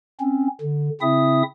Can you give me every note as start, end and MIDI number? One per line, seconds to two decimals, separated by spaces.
0.20 0.47 60
0.20 0.47 61
0.61 0.89 50
1.01 1.42 49
1.01 1.42 60
1.01 1.42 64
1.01 1.42 76
1.01 1.42 87